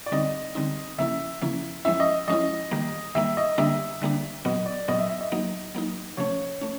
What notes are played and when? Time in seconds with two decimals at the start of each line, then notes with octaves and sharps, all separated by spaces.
0.06 D5
0.12 D3 G3 C4 D#4 D#5
0.55 D3 G3 C4 D#4
0.98 C#3 F3 A#3 C#4 E4 E5
1.41 C#3 F3 A#3 C#4 E4
1.85 F3 G#3 C#4 E4 E5
2.00 D#5
2.28 F3 G#3 C#4 E4 D#5
2.71 D#3 G3 A#3
3.15 D#3 G3 A#3 E5
3.37 D#5
3.58 D3 G3 A#3 D4 E5
4.02 D3 G3 A#3 D4
4.45 A#2 F#3 B3 D#5
4.66 D5
4.88 A#2 F#3 B3 D#5
4.99 E5
5.09 E5
5.21 D#5
5.32 F#3 A#3 D#4
5.75 F#3 A#3 D#4
6.17 C3 F3 A3 C#4 C#5
6.61 A3 C#4